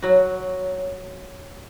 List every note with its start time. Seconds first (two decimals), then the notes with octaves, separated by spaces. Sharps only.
0.02 F#3 F#4